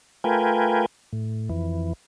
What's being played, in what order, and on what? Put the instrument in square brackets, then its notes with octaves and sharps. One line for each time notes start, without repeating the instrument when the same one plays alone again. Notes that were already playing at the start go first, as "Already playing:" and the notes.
[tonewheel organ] A3 F4 A#4 B4 G5 G#5
A2
F2 E3